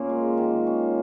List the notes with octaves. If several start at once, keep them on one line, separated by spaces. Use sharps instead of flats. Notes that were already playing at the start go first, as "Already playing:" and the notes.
Already playing: A#2 A#3 C#4
G#3
D#3
C#4